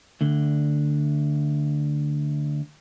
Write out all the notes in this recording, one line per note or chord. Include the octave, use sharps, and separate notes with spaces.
D2 D3